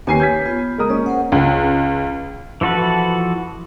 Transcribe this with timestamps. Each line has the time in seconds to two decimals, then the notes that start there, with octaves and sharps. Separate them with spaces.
0.07 D#2 B4 C#5 G#5 C7
0.20 C#5 G6 G#6 B6
0.46 B3 F4
0.78 G#3 A#4 D#6
0.90 A#3 C#4 D#5
1.06 A#4 C5 F#5
1.32 C#2
2.61 E3 F3 F#4 A4 B4